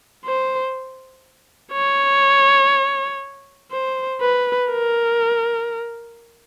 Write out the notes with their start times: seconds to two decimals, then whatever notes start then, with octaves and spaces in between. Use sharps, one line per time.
0.25 C5
1.73 C#5
3.71 C5
4.21 B4
4.71 A#4